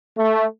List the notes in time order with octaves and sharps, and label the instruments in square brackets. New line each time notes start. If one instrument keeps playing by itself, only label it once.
[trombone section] A3